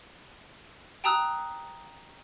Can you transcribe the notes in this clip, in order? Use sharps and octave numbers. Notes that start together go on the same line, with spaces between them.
G5 A5 A#5 D#6 E6 F#6